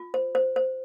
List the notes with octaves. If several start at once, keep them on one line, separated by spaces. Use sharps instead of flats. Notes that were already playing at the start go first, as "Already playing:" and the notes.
Already playing: F4
C5
C5
C5